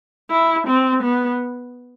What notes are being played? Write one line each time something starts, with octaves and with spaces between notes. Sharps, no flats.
E4
C4
B3